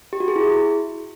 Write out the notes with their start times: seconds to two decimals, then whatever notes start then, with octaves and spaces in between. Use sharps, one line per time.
0.13 G4
0.20 F#4
0.28 G#4
0.36 E4